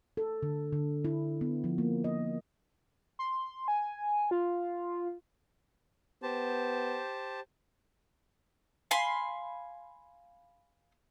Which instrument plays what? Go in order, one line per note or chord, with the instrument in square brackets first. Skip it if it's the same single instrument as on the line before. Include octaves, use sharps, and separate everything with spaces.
[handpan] A4
D3
D3
E4
B3
F3
A#3
D#5
[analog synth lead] C6
G#5
F4
[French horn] B3 [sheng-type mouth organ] G4 C5 A5
[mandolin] F5 G#5 B5 C6